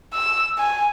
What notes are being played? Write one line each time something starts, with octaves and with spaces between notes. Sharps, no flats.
E6
G#5